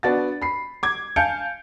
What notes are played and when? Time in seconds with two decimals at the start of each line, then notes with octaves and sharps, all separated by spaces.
0.03 B3 D4 F#4 A6
0.42 B5 C7
0.83 D6 G#6
1.16 F5 G#5 A5 G6 C#7 D7